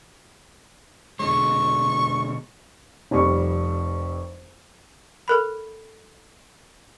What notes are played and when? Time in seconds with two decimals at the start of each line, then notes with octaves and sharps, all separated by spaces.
1.20 B2 D3 G#3 C#6
3.11 F1 F2 G3 C#6
5.28 A4 A#4 B5